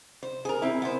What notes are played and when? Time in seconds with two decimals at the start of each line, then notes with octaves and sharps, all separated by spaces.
0.23 C5
0.45 G#4 A#4
0.62 C4 E4
0.82 B3 C5